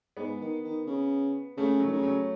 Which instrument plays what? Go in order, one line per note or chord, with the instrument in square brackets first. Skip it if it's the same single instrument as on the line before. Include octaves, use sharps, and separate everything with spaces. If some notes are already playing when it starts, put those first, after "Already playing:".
[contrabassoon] G#2 [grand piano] B3
[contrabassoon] D#3
D#3
C#3
[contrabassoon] C#3 [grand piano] A3
[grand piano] F#3
[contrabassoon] D#3
C#3
[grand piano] F#3